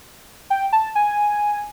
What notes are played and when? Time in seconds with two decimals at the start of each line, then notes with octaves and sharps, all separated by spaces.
0.50 G5
0.73 A5
0.95 G#5